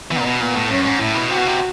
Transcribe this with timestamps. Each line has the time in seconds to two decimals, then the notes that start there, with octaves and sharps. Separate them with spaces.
0.11 E3 B3
0.20 A#2
0.26 B2
0.40 A#2 B3
0.56 A2
0.70 F#2 C#4
0.85 G#2
1.00 A2 E4
1.15 B2
1.29 C3 F#4
1.38 B2
1.47 C3